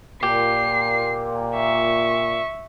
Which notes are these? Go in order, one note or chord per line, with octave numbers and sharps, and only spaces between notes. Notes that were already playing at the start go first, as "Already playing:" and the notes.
A#2 G4 C7
E5 C#6